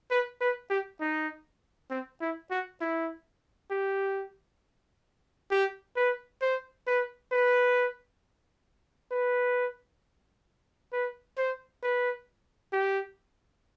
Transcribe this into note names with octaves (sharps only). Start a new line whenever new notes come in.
B4
B4
G4
D#4
C4
E4
F#4
E4
G4
G4
B4
C5
B4
B4
B4
B4
C5
B4
G4